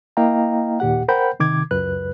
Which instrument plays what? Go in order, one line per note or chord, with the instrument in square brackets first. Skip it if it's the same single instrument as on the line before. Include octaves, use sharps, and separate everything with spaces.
[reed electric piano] A#3 E4 D#5 F5 G5 A#5
D#2 A#2 G4 F#5
A#4 C5 F#5 G5 B5 G6
C3 D#3 D6 G#6
C#2 F#2 B4 F#6